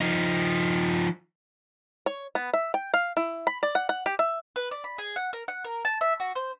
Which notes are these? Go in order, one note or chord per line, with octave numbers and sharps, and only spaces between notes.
F3 D#4
C#5
B3
E5
G5
F5
E4
B5
D5
F#5
F#5
G4
E5
B4
D5
B5
G#4
F#5
A#4
F#5
A#4
A5
E5
F#4
C5